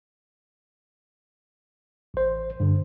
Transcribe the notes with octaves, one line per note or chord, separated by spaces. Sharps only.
A1 C5
G2 D3